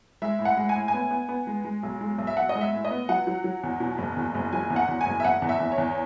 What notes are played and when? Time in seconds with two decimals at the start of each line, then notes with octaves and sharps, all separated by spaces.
0.22 G#3 E5
0.39 A2
0.45 F#5
0.57 G#3
0.69 G#5
0.75 A2
0.88 G#5
0.94 B3
1.11 B3
1.29 B3
1.47 G#3
1.65 G#3
1.83 B1
2.01 G#3
2.18 B1
2.27 E5
2.37 B1 F#5
2.49 D#5
2.55 G#3
2.61 E5
2.73 A2
2.85 D#5
2.91 B3
3.09 F#3 F#5
3.27 F#3
3.44 F#3
3.63 E2
3.80 B2
3.98 F#1
4.17 E2
4.35 F#1
4.53 F#3 G#5
4.70 E2
4.76 F#5
4.88 E2
5.01 G#5
5.06 F#1
5.20 E5
5.24 F#1 F#5
5.42 E2
5.49 E5
5.60 E2
5.72 C#5
5.78 E2